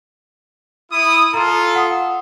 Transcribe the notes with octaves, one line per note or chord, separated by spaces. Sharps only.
E4 D#6
F4 A4 A#5 C6
F#5 D#6